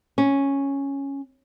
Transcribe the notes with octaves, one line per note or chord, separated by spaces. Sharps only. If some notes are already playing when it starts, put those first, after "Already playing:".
C#4